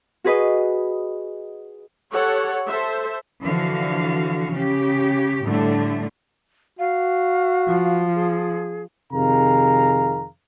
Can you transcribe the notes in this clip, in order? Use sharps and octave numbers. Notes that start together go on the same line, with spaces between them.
F#4 G#4 B4 D#5
G4 A4 C#5 F#5
A4 C5 E5
D3 E3 F3 F#4 F5
C#3 G4
A2 D3 G3 A3
F#4 F5
F3
G#4
F2 C3 D#3 G#4 F5 A#5